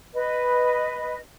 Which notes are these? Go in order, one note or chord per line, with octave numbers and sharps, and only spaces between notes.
B4 D#5